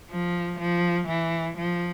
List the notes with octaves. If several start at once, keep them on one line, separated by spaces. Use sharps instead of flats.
F3
F3
E3
F3